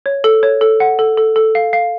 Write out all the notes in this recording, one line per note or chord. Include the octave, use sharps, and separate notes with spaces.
C#5
A4
C#5
A4
F#5
A4
A4
A4
F5
F5